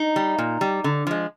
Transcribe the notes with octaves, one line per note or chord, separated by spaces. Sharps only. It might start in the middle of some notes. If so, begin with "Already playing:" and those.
Already playing: D#4
G3
A#2
G3
D3
F3 G#3